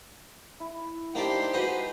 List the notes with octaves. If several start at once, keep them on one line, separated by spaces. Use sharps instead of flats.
E4
A#3 D4 D#4 G4 A4 C5 D5
G#3 F#4 B4 D#5